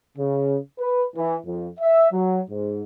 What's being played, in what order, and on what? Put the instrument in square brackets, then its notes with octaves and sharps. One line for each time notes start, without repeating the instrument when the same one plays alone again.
[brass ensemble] C#3
B4
E3
F2
E5
F#3
G#2